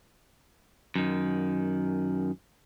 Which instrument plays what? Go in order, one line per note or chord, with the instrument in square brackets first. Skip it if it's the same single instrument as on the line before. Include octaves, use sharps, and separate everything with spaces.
[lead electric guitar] F#2 D#3